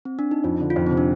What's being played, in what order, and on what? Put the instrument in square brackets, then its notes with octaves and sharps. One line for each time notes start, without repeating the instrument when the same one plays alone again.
[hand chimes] C4
D4
D#4
[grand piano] F2 [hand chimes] F4
[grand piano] D3
[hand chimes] F4
[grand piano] F2 [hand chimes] D#4
[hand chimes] C4
[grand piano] C3
[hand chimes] D4